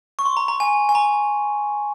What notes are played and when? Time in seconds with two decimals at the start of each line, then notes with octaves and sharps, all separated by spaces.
0.19 C#6
0.26 C6
0.37 A#5
0.48 A#5
0.60 G#5
0.89 G#5
0.95 A#5